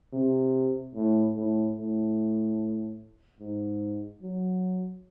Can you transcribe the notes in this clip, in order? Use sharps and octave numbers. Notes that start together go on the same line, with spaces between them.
C3
A2
A2
A2
G#2
F#3